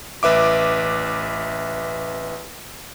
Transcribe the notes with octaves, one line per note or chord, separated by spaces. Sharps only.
A1 B4 E5 D6